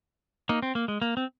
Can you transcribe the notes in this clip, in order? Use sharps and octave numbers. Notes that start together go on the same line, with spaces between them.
A#3 D#4
C4
A#3
G#3
A#3
C4